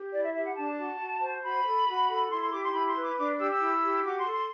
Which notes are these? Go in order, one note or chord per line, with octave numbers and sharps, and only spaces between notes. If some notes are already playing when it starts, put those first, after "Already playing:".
Already playing: G4
E4 D5
E5
G4 E5
F#5
D4 A5
F#4
F#4
C5
F#4 B5
A4
F#4
A4
E4 C6
C6
G4 D6
C6
E4 B5
C6
B4
D6
D4 D6
G4 E6
E6
E4
G4
F#4 D6
C6
A4
C6